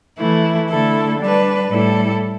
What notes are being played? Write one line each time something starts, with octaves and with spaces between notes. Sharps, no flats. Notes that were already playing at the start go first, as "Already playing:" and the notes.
E3 A3 E4
D3 A3 E4 A4
G3 D4 B4
A2 G3 E4 A4